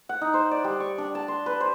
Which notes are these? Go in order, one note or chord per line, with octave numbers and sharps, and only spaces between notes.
F#5
D#4
C5
D5
G3
C#6
D4
A5
C6
B4
C5